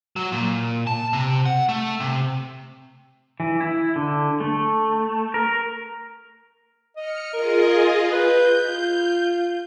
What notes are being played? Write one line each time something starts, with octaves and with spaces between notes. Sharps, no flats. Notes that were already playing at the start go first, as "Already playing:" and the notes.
F#3
A#2
A5
C3
F#5
A3
C3
E3
E4
D3
A3
A#4
D#5 F6 C#7
F4 G#4 A#4 D#5
B4 G6
F4